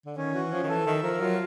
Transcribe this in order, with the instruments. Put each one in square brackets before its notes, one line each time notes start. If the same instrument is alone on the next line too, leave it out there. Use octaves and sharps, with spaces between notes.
[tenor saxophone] D3
[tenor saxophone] D#3 [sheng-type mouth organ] C#4
[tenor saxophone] E3 [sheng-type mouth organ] F#4
[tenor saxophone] F3 [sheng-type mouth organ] C#4
[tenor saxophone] D#3
[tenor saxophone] E3 [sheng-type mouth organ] A4
[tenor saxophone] D#3 [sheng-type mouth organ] E5
[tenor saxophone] F3 [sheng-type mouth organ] A#4
[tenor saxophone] F#3 [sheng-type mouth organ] F4